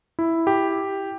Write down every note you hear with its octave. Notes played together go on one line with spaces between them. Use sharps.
E4
G4